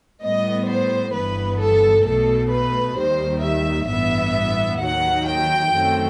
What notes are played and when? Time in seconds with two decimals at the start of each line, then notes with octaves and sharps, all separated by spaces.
0.22 A2 G3 B3 D#5
0.68 C5
1.14 G1 G2 E3 B3 B4
1.60 A4
2.06 B1 B2 A3 A4
2.52 B4
2.97 D#2 D#3 G3 C5
3.43 E5
3.89 A1 G2 E3 B3 E5
4.81 D#2 D#3 F#3 F#5
5.27 G5
5.73 F#2 D#3 F#3 A3 C4